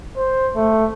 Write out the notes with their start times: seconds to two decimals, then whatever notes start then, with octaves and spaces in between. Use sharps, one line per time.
0.17 C5
0.56 A3